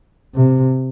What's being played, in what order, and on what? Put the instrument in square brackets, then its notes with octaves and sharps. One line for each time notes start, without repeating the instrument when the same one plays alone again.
[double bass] C3